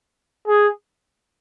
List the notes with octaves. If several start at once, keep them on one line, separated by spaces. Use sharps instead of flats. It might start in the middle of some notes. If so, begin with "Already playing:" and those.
G#4